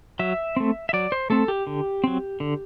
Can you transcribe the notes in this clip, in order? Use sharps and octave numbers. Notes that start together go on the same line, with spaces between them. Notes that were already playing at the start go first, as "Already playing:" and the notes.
F#3 E5
A3 C4
E5
F#3 D5
C5
A3 C4 A4
G4
D3
F#3 C4
D3